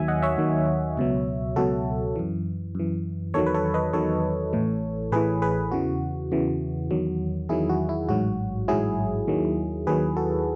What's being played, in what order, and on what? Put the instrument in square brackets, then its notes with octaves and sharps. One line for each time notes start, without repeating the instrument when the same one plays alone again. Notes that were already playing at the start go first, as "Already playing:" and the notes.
Already playing: [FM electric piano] D#2 D#3 F#3 E5 G#5
D#5 F#5
C#5 E5
D#2 D#3 F#3
C#2 B2 F#3
C#2 B2 F#3 F#4 A4
F#2 E3
F#2 E3
E2 D#3 F#3 A4 C#5
B4
A4 C#5
B4 D#5
E2 D#3 F#3 A4 C#5
A1 A2 E3
A1 A2 E3 G#4 B4
G#4 B4
E2 C#3 E3 F#4
E2 C#3 E3
E2 D#3 F#3
E2 D#3 F#3 E4 G#4
F#4
E4
A1 G#2 F#3 F#4
A1 G#2 F#3 E4 G#4
D#2 D#3 F#3
D#2 D#3 F#3 G#4 B4
F#4 A4